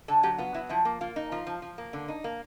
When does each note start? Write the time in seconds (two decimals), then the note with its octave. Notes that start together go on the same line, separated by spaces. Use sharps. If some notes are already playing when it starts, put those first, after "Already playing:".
0.08 D3 A4
0.23 F#3 G4
0.38 B3 F4
0.54 F#3 E4
0.69 F3 E4
0.85 A#3
1.01 A#3 F4
1.16 D#4
1.32 F3 F4
1.47 F3
1.62 F3
1.78 A#3
1.93 D3
2.08 D#4
2.24 A#3